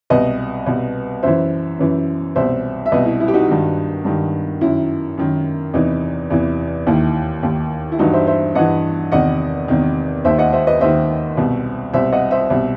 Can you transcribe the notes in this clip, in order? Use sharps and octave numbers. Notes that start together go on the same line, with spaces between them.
C2 B2 B4 D#5
C2 B2
F#2 E3 C5 E5
F#2 E3
C2 B2 C5 E5
E5
C2 B2 B4 D#5
E4
E4
G4
D#4 F#4
G2 D#3
G2 D#3
F#2 D#3 E4
F#2 D#3
E2 C3 E3 D#4
E2 C3 E3
D#2 D#3 E4
D#2 D#3
E4
G2 E3 D#4 F#4
C5 E5
C5 E5
G2 E3 D#5 F#5
E2 C3 D#3 D#5 F#5
E2 C3 D#3
D#2 D#3 C5 E5
D#5 F#5
C5 E5
B4 D#5
D#2 D#3 C5 E5
C2 B2
C2 B2 C5 E5
D#5 F#5
C5 E5
C2 B2